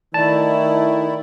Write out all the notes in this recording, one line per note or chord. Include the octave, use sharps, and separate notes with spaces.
D#3 A3 E4 D5 A5